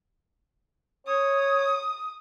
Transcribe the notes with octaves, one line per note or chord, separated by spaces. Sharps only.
C#5 D#6